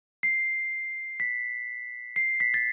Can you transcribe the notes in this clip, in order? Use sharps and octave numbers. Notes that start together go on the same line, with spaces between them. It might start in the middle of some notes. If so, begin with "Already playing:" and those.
C7
B6
C7
B6
A6